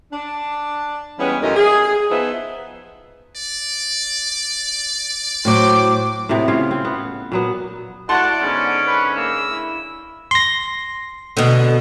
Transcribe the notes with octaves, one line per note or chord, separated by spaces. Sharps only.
D4
E3 G3 G#3 B3 C#4
F#2 A#2 D#3 A3 C#4 D#5
G#4
F3 B3 D#4 B4 C5 E5
D5
A2 F#3 C5 D6
A2 C3 B3
C#3 F4 C#5
C4
B3
A#2 F#3 B3
A3 E4 F#4 D5 F#5 A5 C6
G#2 D3 B3 C#4
B4
A#3 E6
E4
C6 A#6
B2 D3